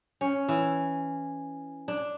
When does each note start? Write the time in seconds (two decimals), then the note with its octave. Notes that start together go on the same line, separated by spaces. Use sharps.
0.21 C#4
0.48 E3
1.88 D4